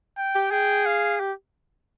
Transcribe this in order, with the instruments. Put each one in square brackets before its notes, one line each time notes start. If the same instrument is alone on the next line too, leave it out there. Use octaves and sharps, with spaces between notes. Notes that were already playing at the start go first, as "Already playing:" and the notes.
[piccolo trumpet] G5
[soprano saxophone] G4
[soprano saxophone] G#4 [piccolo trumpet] G5
[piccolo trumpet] F5
[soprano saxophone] G4